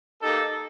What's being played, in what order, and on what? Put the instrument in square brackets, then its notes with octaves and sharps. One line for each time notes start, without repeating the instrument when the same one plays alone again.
[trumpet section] A#3 D#4 G4 A4